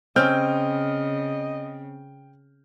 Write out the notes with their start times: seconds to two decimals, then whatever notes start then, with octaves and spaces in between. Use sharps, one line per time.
0.16 C#3 C4 C#4 D#5 G5 F6 G6